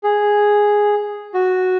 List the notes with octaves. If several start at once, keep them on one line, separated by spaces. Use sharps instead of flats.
G#4
F#4